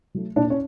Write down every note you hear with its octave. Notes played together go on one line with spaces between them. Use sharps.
F#3 A3
A#2 D4 D5
C#4 C#5